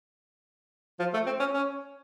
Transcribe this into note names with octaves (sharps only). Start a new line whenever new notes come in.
F3
A3
C4
C#4
C#4